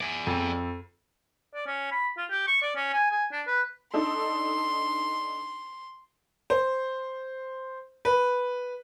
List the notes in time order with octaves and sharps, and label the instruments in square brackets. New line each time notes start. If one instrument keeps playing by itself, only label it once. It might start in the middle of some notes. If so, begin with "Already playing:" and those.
[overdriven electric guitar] G#4 D5
[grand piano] F2
[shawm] D5
C#4
B5
F4
G4
C#6
D5
C#4
G#5
G#5
D4
B4
[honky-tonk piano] D4 D#4 A4 [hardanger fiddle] C6
[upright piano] C5
B4